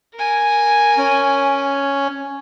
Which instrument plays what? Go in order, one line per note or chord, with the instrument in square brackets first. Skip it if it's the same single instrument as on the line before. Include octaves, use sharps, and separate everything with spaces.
[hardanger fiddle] A#4 G#5
[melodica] C#4